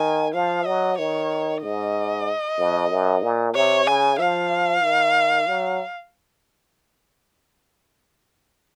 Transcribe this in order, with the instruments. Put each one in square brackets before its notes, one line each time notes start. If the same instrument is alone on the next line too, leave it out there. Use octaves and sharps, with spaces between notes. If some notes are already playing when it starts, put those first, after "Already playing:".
Already playing: [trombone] D#3 [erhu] G#5
[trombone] F3 [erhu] F5
[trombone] F#3 [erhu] D#5
[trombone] D#3 [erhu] C#5
[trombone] G#2 [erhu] D#5
[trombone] F2
F#2
A#2
[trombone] C3 [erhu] C#5
[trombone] C#3 [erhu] G#5
[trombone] F3 [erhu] F5
[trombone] D#3
F#3